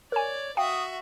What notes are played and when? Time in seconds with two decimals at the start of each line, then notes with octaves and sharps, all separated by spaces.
0.12 A#4 C#5 D5 G#5
0.57 F#4 E5 F5 G5 D#6